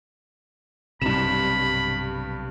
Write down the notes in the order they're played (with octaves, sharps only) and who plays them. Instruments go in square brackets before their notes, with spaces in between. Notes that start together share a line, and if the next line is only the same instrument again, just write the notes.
[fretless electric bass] B1 C3 [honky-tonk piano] G2 E7 [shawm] B5